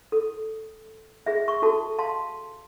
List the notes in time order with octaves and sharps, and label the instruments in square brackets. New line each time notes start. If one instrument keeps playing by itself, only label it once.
[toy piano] A4
G#4 E5
C#6
F#4 A4 A5
F5 A5 C6